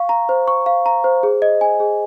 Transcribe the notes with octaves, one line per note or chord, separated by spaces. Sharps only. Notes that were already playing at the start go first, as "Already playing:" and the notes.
Already playing: F5 C#6
A#5
C5
C#6
F5
A#5
C5
G#4
D#5
G#5
G#4